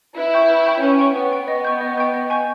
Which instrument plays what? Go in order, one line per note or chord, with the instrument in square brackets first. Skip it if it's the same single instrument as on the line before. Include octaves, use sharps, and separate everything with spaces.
[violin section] E4 [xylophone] B4
[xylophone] G5 C#6 G6
B4
G5 C#6 G6
[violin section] C#4 [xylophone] B4
[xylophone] G5 C#6
[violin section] B3 [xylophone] B4
[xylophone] G5 C#6
[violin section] B3 [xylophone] D#5
[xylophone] G5 C#6 G6
D#5
G5 C#6 G6
D#5
G#5 C#6 G6